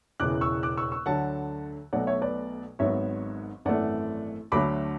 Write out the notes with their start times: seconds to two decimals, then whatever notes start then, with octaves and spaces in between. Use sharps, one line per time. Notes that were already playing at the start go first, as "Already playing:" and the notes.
0.20 E1 E2 C#3 E3 D6 F#6
0.41 C#6 E6
0.63 D6 F#6
0.77 C#6 E6
0.92 C#6 E6
1.06 D2 D3 F#3 F#5 A5
1.93 B1 B2 F#3 A3 D5 F#5
2.07 C#5 E5
2.22 B4 D5
2.79 G#1 G#2 F#3 B3 C#5 E5
3.65 G#1 F#2 E3 A3 D5 F#5
4.52 D2 D3 F#3 A3 B5 D6